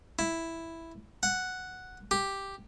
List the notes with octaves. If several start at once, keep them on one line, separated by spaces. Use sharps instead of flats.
E4
F#5
G4